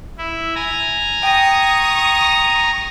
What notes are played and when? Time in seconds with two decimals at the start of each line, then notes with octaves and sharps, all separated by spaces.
0.18 E4
0.55 G#5 A#5
1.23 G5 C#6 D#6 A#6